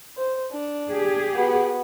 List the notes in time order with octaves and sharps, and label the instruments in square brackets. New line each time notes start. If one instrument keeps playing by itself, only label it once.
[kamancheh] C5
D4
[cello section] G4 G#4
[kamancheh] B3 F#4